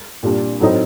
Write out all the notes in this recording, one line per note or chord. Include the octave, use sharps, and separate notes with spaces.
A#2 G3 D4
A2 F#3 C4 D#4